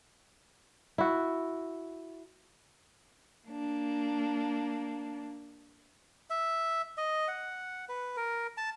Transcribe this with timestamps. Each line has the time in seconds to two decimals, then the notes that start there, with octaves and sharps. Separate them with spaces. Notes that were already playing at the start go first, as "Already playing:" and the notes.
0.98 E4 F#4
3.48 A#3 D4
6.30 E5
6.98 D#5
7.28 F#5
7.89 B4
8.16 A#4
8.57 A5